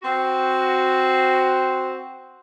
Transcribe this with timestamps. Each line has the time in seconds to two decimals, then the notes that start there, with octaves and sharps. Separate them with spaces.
0.03 C4 F#4